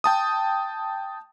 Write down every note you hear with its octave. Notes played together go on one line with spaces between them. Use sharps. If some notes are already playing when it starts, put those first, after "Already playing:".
G5 A5 D#6